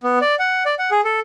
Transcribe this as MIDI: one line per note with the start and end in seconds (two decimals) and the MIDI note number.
0.03 0.19 59
0.21 0.35 74
0.39 0.63 78
0.66 0.75 74
0.79 0.90 78
0.91 1.01 68
1.05 1.20 69